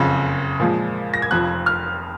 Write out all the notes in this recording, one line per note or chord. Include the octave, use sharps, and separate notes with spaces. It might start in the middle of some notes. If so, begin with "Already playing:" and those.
Already playing: F#1 F2 C#3
A#2 F3 G#3
A#6
G#6
F1 F2 F3 F#6
F6